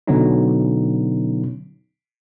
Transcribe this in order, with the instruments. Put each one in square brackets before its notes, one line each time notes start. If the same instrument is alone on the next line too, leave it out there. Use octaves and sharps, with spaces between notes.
[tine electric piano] B2 D3 F#3 B3 C#4 D#4